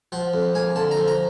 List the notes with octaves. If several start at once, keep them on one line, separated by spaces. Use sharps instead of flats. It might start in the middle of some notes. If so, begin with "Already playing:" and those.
F3 F#5
F2
A#3 G#5
D3 A5
A#5
F3
A#5